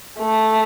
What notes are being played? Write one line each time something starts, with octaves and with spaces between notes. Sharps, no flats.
A3